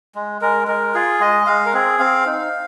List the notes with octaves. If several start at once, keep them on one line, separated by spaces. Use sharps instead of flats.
G#3
G#3 A#4
G#3 A#4
F4 G#4
G#3 D#5
G#3 F5
A#4
C4 G#4
C4 F5
D#4